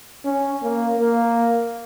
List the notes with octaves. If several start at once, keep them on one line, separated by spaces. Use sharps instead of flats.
C#4
A#3
A#3